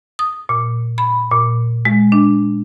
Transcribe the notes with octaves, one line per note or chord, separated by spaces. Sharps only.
D#6
A#2
B5
A#2
G#3
D4